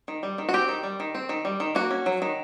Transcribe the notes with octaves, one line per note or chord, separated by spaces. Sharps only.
D#3
G3
D#3
F#4
C4 G4
D#3
G3
D#3
C4
D#3
G3
D#3
A#3 F#4
C#4
F#3
D#3